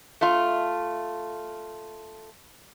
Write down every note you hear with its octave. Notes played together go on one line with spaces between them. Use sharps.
A3 F4